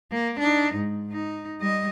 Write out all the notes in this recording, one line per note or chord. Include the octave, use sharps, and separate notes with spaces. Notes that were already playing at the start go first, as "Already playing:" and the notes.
A#3
D4 D#4
G#2
D#4
G3 D#5